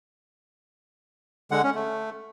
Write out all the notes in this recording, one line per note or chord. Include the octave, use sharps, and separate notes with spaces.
D3 G#3 F#5
C#4
A3